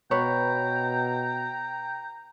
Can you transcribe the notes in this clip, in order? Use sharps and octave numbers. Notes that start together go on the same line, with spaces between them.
B2 B4 C#5 G5 A#5